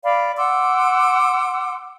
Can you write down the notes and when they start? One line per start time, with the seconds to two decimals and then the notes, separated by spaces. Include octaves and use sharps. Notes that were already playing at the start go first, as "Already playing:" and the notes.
0.03 D5 F5 B5
0.37 F#5 C6 D6 E6